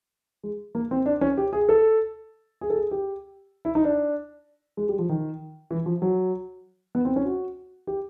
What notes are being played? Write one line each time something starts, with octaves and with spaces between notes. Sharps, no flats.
G#3
A#3
C4
D4
C#4
G4
G#4
A4
G#4
A4
G#4
G4
E4
D#4
D4
G#3
G3
F3
D#3
E3
F3
F#3
B3
C4
C#4
F#4
G4